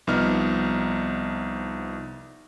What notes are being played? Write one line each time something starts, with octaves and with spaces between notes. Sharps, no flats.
C2 F3 B3 D#4 F6